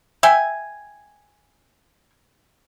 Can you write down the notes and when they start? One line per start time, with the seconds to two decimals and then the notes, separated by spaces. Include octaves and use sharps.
0.23 E5 G5 G#5